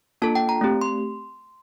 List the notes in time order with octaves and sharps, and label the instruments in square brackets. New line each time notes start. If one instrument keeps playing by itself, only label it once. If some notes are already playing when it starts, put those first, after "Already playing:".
[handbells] A#3 D4 F4 A4 A5
G5
A#5
A3 C4 G4
C6